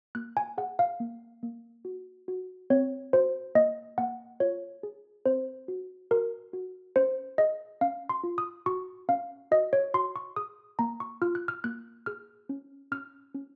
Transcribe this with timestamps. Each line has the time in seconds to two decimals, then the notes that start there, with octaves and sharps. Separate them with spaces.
0.15 A#3 F#6
0.37 G#5
0.58 G#4 F#5
0.79 F5
1.00 A#3
1.43 A#3
1.85 F#4
2.28 F#4
2.70 C4 C#5
3.13 F#4 C5
3.55 A#3 D#5
3.98 A#3 F#5
4.40 F4 C#5
4.83 G#4
5.26 C4 C5
5.68 F#4
6.11 F#4 A#4
6.53 F#4
6.96 C#4 C5
7.38 G#4 D#5
7.81 C#4 F5
8.09 C6
8.24 F4
8.38 D#6
8.66 F#4 C#6
9.09 C#4 F5
9.51 F#4 D#5
9.73 C#5
9.94 F#4 C6
10.16 C#6
10.36 G#4 D#6
10.79 A#3 A#5
11.00 C#6
11.22 F4 F6
11.35 F#6
11.48 F6
11.64 A#3 F#6
12.06 G#4 F6
12.49 C#4
12.92 C#4 F6
13.34 C#4